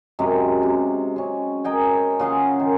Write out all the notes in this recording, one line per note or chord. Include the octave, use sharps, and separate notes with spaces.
F#2 C3 G#3
C3
G#3 C#4
A#4 D#5 G5 G#5
C#3 F4 G#4 F#5
D#3